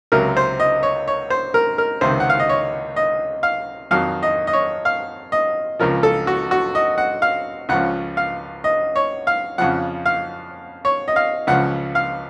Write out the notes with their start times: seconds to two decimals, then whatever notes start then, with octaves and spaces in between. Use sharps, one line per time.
0.12 C#2 C3 F#3 A#4
0.37 C5
0.60 D#5
0.83 C#5
1.08 C#5
1.30 C5
1.54 A#4
1.78 A#4
2.01 C#2 C3 D#3 C5
2.20 F#5
2.30 F5
2.40 D#5
2.49 C#5
2.96 D#5
3.43 F5
3.91 F2 D#3 F#3 F5
4.23 D#5
4.47 D#5
4.53 C#5
4.85 F5
5.32 D#5
5.79 C#2 C#3 F3 A#4
6.03 A4
6.27 F#4
6.51 F#4
6.75 D#5
6.98 F#5
7.22 F5
7.69 C#2 C#3 F3 F#5
8.17 F5
8.64 D#5
8.96 C#5
9.27 F5
9.58 F2 C#3 F3 F#5
10.06 F5
10.85 C#5
11.08 D#5
11.16 F5
11.47 C#2 C#3 F3 F#5
11.95 F5